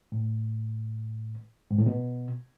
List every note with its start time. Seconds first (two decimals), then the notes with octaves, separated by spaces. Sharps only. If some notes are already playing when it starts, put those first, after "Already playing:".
0.12 A2
1.71 G#2
1.79 A2
1.86 B2